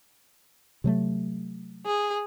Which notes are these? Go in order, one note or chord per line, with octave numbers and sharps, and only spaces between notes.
C3 F#3 A3
G#4